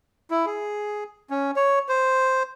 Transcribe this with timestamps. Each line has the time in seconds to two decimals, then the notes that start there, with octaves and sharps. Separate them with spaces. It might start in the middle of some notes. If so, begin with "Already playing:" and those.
0.31 E4
0.46 G#4
1.30 C#4
1.56 C#5
1.89 C5